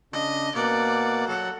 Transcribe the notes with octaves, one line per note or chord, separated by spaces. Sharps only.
C#3 D4 D#5
B2 A#3 D5 F#5
F#3 F#4 A4 F#5